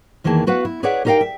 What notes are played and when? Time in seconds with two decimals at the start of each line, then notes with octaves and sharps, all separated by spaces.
0.24 E2 D#3 E3 A#3 G#4 A5
0.47 B3 F#4 B4 F5 F#5
0.65 E4
0.83 G#4 B4 C#5 D5 E5 F#5
1.05 D#4 G4 A#4 D5 F5 G5
1.21 E5